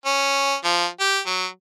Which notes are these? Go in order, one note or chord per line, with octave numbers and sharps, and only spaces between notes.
C#4
F3
G4
F#3